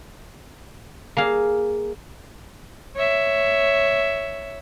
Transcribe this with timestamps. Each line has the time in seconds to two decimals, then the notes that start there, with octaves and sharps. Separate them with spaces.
1.17 A#3 G#4 F5
2.96 C#5 E5